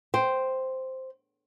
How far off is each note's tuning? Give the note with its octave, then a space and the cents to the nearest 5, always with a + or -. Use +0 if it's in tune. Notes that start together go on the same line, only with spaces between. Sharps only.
C5 +0 G5 +0